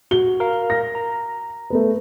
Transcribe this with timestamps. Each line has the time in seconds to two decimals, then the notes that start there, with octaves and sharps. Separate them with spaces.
0.11 F#4 G7
0.40 A#4 F5
0.70 A#6
0.95 A#5
1.70 A3 B3 B4